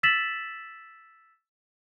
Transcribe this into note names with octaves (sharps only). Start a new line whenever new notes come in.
E6 A6 B6 E7 F#7